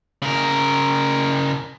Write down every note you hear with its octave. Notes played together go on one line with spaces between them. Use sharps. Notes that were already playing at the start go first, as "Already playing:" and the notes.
C#3 A#4